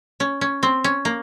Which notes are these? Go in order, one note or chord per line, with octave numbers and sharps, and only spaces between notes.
C#4
C#4
C4
C#4
A#3